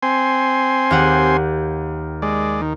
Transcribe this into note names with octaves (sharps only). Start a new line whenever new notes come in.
C4 G#5 C6
D#2 G4 F#5
G#3 D5
D#3